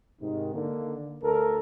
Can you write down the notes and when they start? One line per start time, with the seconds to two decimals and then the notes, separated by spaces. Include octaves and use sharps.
0.20 G#2 C3 D#3
0.53 D3 D#3 A#3
1.22 D2 A4 A#4